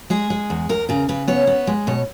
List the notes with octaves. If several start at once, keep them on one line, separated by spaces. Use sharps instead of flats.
G#3 G#4
G#3
E2
E2 A#4
C#3 A#4
C#3 B4
B3 C#5
B3
G#3
B2 C#5